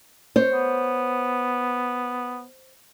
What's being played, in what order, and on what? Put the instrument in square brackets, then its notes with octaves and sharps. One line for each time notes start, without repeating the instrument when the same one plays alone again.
[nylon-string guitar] C5 C#5
[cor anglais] B3